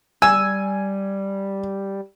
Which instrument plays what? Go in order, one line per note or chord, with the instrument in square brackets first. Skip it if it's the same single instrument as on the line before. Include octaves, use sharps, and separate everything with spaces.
[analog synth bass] G3 [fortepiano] G#5 [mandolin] E6